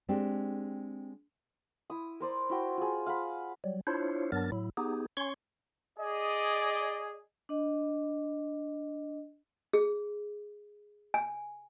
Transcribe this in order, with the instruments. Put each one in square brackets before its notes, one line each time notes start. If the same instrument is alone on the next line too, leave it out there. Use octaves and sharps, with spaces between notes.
[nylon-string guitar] G#3 C4 D4 G4
[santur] E4 D#6
A#4 C5 D5
E4 F#4 G5
F4 G#4
F5 F#5 B5
[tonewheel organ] F#3 G3
D4 E4 F4 C5 C#5
G2 F#3 B3 D4 A#4 A6
A2 F#3 E4
B3 D#4 G4 G#4
C#4 C#5 C6 C#6
[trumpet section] G#4 D5 D#5
[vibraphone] D4 D#5
[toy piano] G#4
G#5